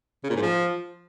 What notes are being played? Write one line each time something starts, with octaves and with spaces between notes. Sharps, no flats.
C#3
A#2
G#2
F3